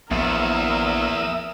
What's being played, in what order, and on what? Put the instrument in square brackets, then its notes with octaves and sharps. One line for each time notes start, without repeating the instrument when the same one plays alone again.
[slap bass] A#1 B3 [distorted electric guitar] E2 [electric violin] A#4 [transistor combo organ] E5 D#6 E6